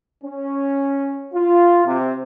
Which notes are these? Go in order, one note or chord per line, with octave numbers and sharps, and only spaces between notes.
C#4
F4
C3